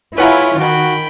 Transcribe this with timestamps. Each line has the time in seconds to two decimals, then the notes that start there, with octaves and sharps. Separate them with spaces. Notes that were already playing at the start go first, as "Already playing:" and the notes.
0.18 E4 F4 G#4 B4 C#5 F#5 A#5
0.60 D#3 F#4 G5 B5